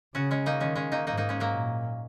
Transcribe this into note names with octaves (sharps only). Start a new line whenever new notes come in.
C#3 C#4 F#4
G#3 C#4
A#3 D#4
D#3 G#3 C#4
G#3 C#4
A#3 D#4
G#2 A#3 D#4
A#3 D#4
G#3 C#4
F#3 A#3
A#2